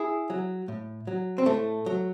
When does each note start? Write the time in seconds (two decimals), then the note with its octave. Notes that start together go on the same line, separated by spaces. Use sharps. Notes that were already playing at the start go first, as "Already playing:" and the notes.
Already playing: E4 G#4
0.30 F#3
0.68 A2
1.07 F#3
1.38 C4
1.46 A2 A3
1.86 F#3